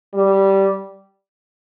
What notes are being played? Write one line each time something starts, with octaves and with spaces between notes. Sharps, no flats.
G3